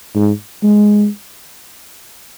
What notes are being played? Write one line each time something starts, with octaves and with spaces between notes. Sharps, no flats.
G#2
G#3